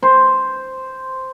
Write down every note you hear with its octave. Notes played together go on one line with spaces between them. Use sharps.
C5